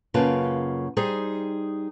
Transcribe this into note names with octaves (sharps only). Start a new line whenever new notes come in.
F#2 C#3 A#3 F4 B4 A5
G3 D#4 G#4 C5